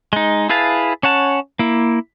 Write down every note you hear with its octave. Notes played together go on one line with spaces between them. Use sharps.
G#3 D#4
E4 G#4 B4 F5 A5
C#4 C#5 F#5 A5
A#3 E4